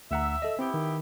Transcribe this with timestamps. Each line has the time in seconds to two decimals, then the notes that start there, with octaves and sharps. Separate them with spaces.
0.11 D2 E5 F#5 A#5
0.42 A4 D#5
0.59 B3 C4 E4 G4
0.74 D#3